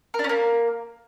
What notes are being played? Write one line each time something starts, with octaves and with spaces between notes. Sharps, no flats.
A#4
D4
C#4
A#3